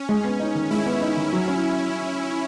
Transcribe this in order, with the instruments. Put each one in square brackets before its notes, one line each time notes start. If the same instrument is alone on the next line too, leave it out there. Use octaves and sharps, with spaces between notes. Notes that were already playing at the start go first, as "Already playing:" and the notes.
Already playing: [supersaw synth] C#4
[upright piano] G#3
B3
D#4
D#3
[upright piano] G#3 [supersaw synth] E4
[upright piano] B3
D#4
D#3
F#3
C#4